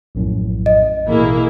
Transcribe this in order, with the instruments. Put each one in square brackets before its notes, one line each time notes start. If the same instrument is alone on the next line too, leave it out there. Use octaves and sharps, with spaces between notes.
[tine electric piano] A#1 F#2 A2
[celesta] D#5
[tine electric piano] A1 B2 [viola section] A#3 E4 G#4